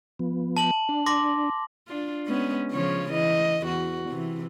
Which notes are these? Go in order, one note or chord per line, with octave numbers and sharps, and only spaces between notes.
F3 B3
A5 F#7
D4
C6 D6 A#6
D4 F4
G#3 B3 C#4
C#3 F3 C#5
E3 D#5
E2 F#4
C3 E3